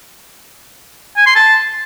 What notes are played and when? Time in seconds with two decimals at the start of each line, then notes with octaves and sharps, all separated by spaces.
1.17 G#5
1.26 C6
1.36 A5